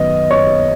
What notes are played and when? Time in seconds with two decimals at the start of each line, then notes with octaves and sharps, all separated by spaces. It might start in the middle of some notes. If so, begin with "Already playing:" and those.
Already playing: F#2 D#3 B3 D#5
0.31 C#5 C#6